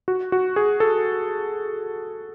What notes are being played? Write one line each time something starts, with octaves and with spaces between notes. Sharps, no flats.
F#4
F#4
G#4
A4